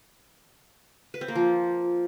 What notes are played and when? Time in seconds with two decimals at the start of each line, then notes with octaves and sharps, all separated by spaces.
1.14 B4
1.21 C4
1.28 A#3
1.36 F3